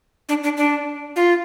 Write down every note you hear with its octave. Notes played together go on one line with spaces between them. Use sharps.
D4
D4
D4
F4